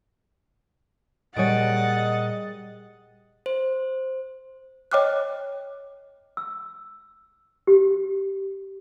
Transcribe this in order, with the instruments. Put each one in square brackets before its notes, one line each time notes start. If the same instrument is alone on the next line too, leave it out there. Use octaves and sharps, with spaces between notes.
[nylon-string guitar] A#2 C#5 [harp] G3 G#4 D7 [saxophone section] D#5 [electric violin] F#5 A6
[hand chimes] C5
[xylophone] C#5 D#5 G5 D6 F6 F#6
[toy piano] E6
G4